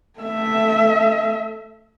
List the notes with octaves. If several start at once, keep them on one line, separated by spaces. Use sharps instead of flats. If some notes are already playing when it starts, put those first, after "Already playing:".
A3 E5